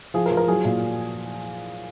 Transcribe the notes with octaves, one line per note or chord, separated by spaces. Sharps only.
F3 G#4
A#4
F3
A#4
F#3 G#4
A#2